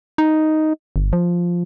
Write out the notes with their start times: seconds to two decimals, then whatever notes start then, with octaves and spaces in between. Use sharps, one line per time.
0.18 D#4
0.96 G1
1.13 F3